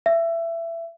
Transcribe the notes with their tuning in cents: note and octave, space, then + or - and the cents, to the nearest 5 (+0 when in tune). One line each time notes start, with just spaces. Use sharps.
E5 +20